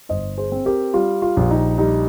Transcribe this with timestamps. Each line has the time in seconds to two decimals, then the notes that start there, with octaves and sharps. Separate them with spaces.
0.09 G1 C5 D#5
0.38 G#4 C5
0.52 C4
0.66 G4 A#4
0.93 G3 F4
1.22 F4
1.37 A#1
1.51 D#4
1.78 G3 D#4